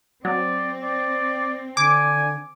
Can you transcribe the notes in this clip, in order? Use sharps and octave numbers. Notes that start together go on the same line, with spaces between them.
F#3 C4 D5
D5
D3 G#5 D6